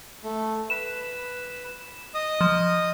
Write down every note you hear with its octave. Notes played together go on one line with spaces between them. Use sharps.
A3
B4 E7
D#5 D#6
F3